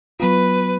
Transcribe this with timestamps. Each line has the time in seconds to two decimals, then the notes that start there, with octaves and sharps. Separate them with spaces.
0.20 F#3 B3 F4 B4